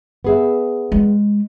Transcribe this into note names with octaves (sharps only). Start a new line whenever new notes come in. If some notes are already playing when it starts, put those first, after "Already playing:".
B3 G#4 E5
G#3